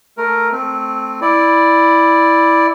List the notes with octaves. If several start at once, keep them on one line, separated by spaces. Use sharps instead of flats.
A3 A#4
A3 C4
E4 D5